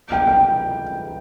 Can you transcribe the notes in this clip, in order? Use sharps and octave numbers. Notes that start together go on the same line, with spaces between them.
G5
G5